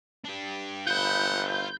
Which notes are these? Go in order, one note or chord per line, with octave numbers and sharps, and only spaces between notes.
D4 G4
G1 F4 F#5 B5 G6